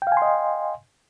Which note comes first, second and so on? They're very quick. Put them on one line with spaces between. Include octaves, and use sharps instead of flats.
G5 F5 G#5 C6 D#5